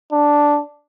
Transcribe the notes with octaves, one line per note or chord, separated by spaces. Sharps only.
D4